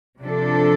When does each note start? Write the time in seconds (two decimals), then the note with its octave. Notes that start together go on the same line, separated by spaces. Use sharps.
0.21 C3 F3 D4 A4